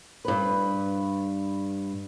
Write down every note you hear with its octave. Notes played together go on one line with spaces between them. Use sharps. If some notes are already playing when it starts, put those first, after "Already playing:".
G2 B4